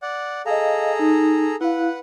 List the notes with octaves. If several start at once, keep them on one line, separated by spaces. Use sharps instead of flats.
D5 F#5
G#4 A4 D#5 F5 A#5
D#4
E4 B4 F5 F#5